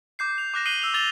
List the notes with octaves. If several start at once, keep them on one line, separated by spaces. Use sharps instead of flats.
D6 G6 C7
F7
D6 F#6 A#6 E7
D#6 F#6 C7 D#7 F#7 G7
E6 F7 G7
D6 A6 F7 G7